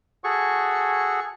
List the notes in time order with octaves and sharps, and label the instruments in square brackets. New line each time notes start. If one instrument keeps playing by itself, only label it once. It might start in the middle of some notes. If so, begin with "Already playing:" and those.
[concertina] F#4 G#4 A4 C#6